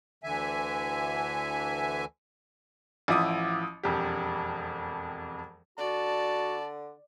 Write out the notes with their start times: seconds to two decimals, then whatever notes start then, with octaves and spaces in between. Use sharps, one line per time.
0.24 D2 D3 E3 E5 G#5
3.08 A1 F3 E4 D6 D#6
3.83 E1 F2 G4
5.78 D3 F#4 D5 A5